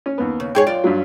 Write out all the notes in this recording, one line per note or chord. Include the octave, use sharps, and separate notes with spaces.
C#4
D#2 B3
C#3
G#2 G#4 C#5 G5
F#2 F4 D5
G2 F#3